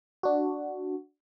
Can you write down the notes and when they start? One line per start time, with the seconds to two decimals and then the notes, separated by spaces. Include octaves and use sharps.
0.23 D4 F#4